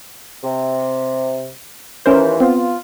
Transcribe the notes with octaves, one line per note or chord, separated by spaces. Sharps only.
C3
D#2 E3 C#4 A#4 C5
B3 C4 F4